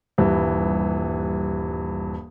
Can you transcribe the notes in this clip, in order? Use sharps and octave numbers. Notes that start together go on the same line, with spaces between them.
D#1 G2 E3